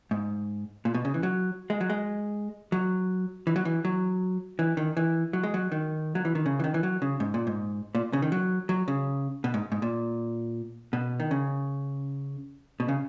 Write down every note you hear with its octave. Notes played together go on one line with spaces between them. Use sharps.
G#2
A#2
B2
C#3
E3
F#3
G#3
F#3
G#3
F#3
E3
F#3
E3
F#3
E3
D#3
E3
F#3
G#3
F#3
D#3
F#3
E3
D#3
C#3
E3
D#3
E3
F#3
C#3
G#2
A#2
G#2
A#2
C#3
D#3
F#3
F#3
C#3
B2
G#2
G#2
A#2
B2
D#3
C#3
B2
C#3